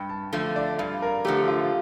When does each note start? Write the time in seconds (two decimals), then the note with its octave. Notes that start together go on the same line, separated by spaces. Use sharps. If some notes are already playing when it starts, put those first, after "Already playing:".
Already playing: G2 G5
0.09 A5
0.33 D3 F3 A3 F5
0.56 D5
0.78 G2 F5
1.02 A#4
1.25 D3 F3 A3 G4
1.48 F4